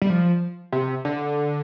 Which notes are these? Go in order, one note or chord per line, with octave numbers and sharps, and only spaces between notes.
G3
F3
C3
D3